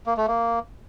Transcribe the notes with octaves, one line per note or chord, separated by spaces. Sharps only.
A#3
A3
A#3